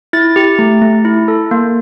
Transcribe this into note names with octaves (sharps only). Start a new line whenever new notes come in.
E4 A6
G4
A3
A3
E4
A4
A#3